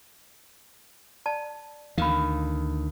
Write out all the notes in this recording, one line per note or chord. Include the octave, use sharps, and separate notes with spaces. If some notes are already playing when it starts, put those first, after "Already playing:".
D5 A5
D2 D#3 F5 B5